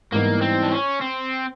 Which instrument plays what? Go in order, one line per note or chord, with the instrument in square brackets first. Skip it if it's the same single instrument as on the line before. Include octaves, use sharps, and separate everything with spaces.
[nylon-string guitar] G#2 E3 G3 B3 D#4 [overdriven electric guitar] A#3
[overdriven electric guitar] C4
D4
C#4
C4